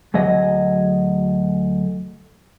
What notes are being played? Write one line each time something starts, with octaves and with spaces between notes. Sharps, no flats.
D2 F#3 G#4 D#5